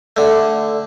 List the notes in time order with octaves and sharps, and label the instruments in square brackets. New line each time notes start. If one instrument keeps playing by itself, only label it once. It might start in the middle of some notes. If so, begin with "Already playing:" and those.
[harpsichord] D3 A3